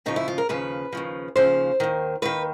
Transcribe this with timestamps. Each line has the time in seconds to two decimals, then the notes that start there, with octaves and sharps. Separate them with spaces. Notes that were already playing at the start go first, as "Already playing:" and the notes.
0.06 D#2 C#3 F3 D#4
0.16 E4
0.28 F4
0.38 A#4
0.49 D#2 C#3 F3 B4
0.92 D#2 C#3 F3
1.36 D#2 C#3 F3 C5
1.80 D#2 D#3
2.22 D#2 D#3 B4